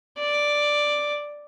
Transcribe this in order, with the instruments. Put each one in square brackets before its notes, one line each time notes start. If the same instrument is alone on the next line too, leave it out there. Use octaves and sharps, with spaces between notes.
[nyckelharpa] D5